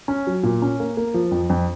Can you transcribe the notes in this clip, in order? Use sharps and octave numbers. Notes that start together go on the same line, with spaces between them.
C#4
F#3
A#2
C#4
A#3
A#3
F3
F2
F2